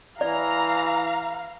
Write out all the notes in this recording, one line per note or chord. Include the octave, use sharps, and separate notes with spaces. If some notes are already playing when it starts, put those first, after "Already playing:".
E3 D5 F5 A#5